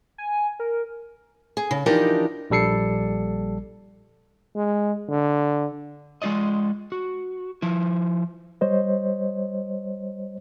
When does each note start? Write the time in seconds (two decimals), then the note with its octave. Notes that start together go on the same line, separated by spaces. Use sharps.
0.18 G#5
0.60 A#4
1.57 G#4
1.71 C#3
1.86 E3 F3 D4 D#4 G4 A#4
2.50 A#1 G3 A4 C7 C#7
4.56 G#3
5.09 D3
6.22 G#3 B3 F4 D5 D#5
6.92 F#4
7.62 F3 E4
8.61 G3 C5 C#5 D#5